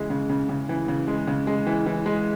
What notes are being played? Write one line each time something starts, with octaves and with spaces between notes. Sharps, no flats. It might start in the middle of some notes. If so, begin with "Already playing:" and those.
Already playing: C#3 E3 G#3
C#3
C#3
C#3
E3
C#3
G#3
C#3
G#3
E3
E3
G#3